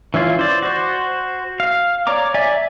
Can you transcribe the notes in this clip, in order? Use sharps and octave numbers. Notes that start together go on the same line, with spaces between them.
E3 C#4 E4 F4
C5 D5
F#4 C5
F5
C#5 D5 A#5 D6
D5 E5 G#5